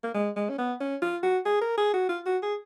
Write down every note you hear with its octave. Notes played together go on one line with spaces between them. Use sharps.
A#3
G#3
G#3
C#4
B3
C#4
F4
F#4
G#4
A#4
G#4
F#4
F4
F#4
G#4